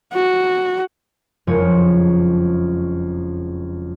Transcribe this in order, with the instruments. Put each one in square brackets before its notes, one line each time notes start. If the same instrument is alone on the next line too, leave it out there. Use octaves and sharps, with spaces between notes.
[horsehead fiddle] F#4
[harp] F#1 F2 F3 G#3 C#5